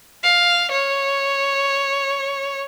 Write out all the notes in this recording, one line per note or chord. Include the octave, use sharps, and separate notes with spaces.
F5
C#5